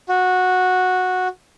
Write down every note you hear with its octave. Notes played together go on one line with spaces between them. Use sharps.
F#4